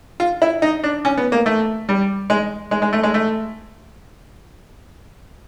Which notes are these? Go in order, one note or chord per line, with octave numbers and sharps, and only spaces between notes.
F4
E4
D#4
D4
C#4
B3
A#3
A3
G3
G#3
G#3
G#3
A3
G#3
A3